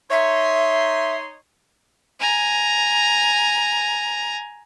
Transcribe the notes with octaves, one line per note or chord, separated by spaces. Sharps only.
D#4 C#5 E5 C6
G#5 A#5